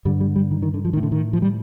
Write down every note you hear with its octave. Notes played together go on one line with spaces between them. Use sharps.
G2 D3 G3
G3
G3
D#3
D#3
D3
F3
A2 D#3
D3
D#3
F3
G3